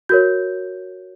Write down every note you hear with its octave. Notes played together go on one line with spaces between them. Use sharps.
F#4 A#4 C#5 G6